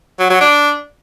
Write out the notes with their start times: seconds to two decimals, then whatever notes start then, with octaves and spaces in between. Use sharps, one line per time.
0.20 F#3
0.30 F#3
0.41 D4